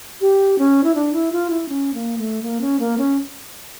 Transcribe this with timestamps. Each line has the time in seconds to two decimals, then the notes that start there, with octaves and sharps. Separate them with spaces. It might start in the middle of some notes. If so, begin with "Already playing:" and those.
0.21 G4
0.58 C#4
0.84 E4
0.95 D4
1.13 E4
1.32 F4
1.50 E4
1.69 C#4
1.94 A#3
2.18 A3
2.43 A#3
2.61 C#4
2.79 A#3
2.98 C#4